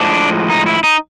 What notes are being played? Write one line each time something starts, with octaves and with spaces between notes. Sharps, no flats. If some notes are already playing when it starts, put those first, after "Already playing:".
Already playing: A2 F3 G#3 D4
D#4
E4
D#4